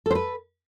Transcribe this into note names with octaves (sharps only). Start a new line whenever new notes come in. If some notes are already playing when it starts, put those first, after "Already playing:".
A4 B4 C5